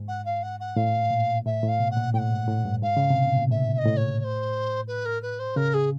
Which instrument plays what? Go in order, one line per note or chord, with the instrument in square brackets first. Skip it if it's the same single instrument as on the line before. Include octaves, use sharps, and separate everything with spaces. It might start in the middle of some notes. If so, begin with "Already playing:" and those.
Already playing: [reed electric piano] G#2
[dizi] F#5
F5
F#5
F#5
[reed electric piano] A2 [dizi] F5
[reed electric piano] A#2
[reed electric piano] A2 [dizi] E5
[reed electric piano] A2
[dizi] F5
[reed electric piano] B2
[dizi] F#5
[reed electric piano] A#2
[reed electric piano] A2 [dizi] G5
[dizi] F#5
[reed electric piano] G#2
A2
G2
[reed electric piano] G#2 [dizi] F5
[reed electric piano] C#3
C3
B2
A#2
[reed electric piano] A2 [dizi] E5
[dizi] E5
D#5
[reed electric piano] A2
[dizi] C#5
C#5
C5
B4
A#4
B4
C5
[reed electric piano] C#3 [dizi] A#4
[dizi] G#4